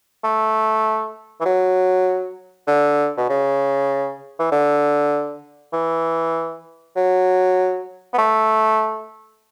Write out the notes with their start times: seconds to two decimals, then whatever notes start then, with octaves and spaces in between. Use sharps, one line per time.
0.24 A3
1.40 E3
1.45 F#3
2.67 D3
3.17 B2
3.29 C#3
4.39 E3
4.52 D3
5.73 E3
6.96 F#3
8.13 B3
8.18 A3